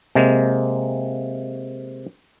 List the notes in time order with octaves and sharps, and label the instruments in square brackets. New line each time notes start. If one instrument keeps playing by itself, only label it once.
[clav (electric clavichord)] C3 G#3 A#3